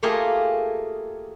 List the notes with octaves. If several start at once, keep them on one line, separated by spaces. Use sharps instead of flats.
A3 A#3 F4 G4 G#4 A#4